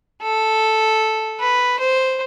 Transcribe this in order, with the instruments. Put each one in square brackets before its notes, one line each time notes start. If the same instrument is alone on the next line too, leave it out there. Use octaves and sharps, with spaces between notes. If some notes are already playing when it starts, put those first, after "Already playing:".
[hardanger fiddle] A4
B4
C5